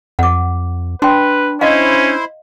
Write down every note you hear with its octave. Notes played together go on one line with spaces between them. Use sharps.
F2 F#5 D6
D4 B4 G5 C6
C#4 E4 C5 D#5 F5